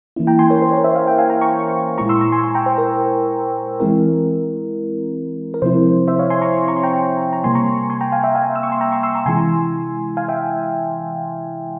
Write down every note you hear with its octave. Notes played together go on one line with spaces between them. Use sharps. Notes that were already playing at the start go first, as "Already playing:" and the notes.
E3 A#3 C#4 E4
G5 A#5
G#5 C6
A#4 C#5
C5
A#4 C#5
C5 E5
C#5 F5
E5 G5
F5 G#5
G5 A#5
A#5 C#6
A#2 G#3 E4 A#5 C#6
C6 E6
A#5 C#6
G#5 C6
G#5 C6
G5 A#5
C5
A#4
E3 G#3 C4 E4 A#4
A#4
C3 F3 C4 E4 C5
C5 E5
C#5 F5
G#5 C6
A#5 C#6
A#5 C#6
C6
G5 A#5
A#5
C3 G3 A#3 G#5 C6
A#5 C#6
G#5 C6
G5 A#5
F5 G#5
E5 G5
F5 G#5
E6
C#6
C6
G5 A#5
A#5 C#6
C6 E6
A#5 C#6
C3 E3 G#3 E4 G#5 C6
F5 G#5
E5 G5